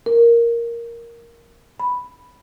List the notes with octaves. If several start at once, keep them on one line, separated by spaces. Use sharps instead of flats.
A#4
B5